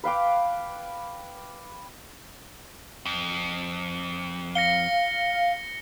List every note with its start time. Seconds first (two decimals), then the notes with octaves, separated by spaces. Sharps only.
0.04 B4 F5 G5 D6
3.05 F2
4.55 F5 A#6 C#7 G7